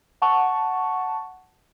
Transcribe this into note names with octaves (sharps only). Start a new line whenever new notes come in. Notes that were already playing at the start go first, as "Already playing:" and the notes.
F#5 A5 C#6